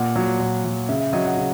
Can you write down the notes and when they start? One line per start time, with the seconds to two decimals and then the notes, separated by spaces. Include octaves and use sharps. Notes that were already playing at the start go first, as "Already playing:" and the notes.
Already playing: A#2 F#5
0.16 F#3
0.40 A#2
0.64 F#3
0.89 C#3 E5
1.00 E5
1.13 F#3 D#5
1.25 F#5
1.37 C#3